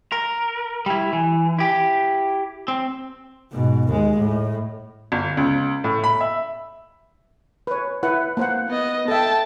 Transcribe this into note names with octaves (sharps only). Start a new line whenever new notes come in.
A#4
G3 E4
E3
E4 G4
C4
G#2 B2
D#2 G#3
A2
G1
C#2
A2
B5
E5
B4 C#5
E4 B4 F#5
A#3 C5 F#5
B3 D#5
A4 E5 G5 A5